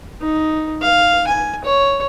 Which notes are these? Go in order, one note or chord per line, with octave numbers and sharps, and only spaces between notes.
D#4
F5
G#5
C#5